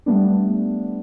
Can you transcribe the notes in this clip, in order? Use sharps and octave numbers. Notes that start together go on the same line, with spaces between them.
G3 A3 B3 D4